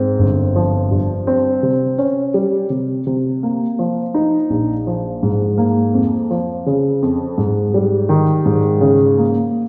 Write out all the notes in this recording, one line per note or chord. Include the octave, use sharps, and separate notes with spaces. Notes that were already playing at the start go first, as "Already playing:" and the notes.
Already playing: G#2 C4
G1
F3
G2
C4
C3
C#4
G3
C3
C3
A#3
F3
D#4
A#1
F3
G#2
A#3
F2
F3
C#3
F2
G#2
G3
D#3
G#2
C#3
A#3